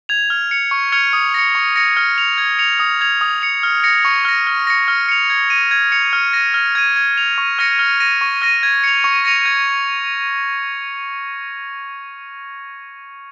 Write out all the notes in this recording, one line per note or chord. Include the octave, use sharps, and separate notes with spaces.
G#6 F7
F6
C#7 F7
C#6
F6 G#6 C#7 F7
D#6
A#6 C#7
C#6
A#6 C#7
F6
C#7 F7
G#6
C#7 F7
D#6
G#6 F7
D#6
C#7 F7
F6
A#6 C#7
C#6
F6 A#6
F6
A#6 C#7
F6
C#7 F7
G#6
D#7
G#6
C#7 F7
F6
A#6 D#7
F6
G#6 D#7
G#6
F7
C#6
F6 A#6 C#7
F6
A#6 D#7
C#6
F6 A#6 D#7
G#6
C#7 F7
C#6
A#6 C#7 F7
G#6